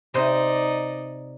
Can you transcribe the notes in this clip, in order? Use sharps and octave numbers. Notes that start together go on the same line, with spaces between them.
C3 D#4 C5 D5